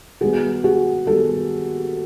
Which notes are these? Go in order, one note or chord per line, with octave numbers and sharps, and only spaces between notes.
D#3 G3 B3 F#4 G#4
F#4 G#4
D#3 G3 B3 G4 A4